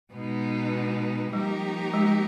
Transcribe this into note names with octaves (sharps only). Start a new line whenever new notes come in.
B2 G#3 B3 D#4
F3 G3 A#3 D#4 G4 A#4
G#3